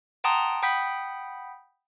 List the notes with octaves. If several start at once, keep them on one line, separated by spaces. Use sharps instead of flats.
F#5 G5 A5 A#5 C6 D#6
F#5 G5 B5 D#6 G6 B6